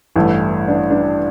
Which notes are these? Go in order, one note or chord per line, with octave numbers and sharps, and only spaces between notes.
A1 G2 E3 A3
D4
D4